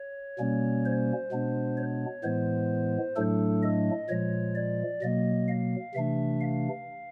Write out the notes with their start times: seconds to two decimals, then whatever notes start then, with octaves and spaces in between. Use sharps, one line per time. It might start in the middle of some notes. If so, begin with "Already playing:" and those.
Already playing: C#5
0.39 B2 G3 A#3 C#4
0.85 C5
1.32 B2 G#3 B3 D4
1.77 C#5
2.24 A2 E3 G#3 B3 C5
3.16 A2 F#3 A3 D4 A4
3.63 D#5
4.09 A#2 F3 G#3 C#5
4.55 D5
5.02 B2 F#3 A#3 D#5
5.48 F5
5.94 C3 E3 A3 D4 E5
6.40 F5